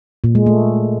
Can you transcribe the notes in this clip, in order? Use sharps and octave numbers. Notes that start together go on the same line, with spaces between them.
A#2
G#3
A3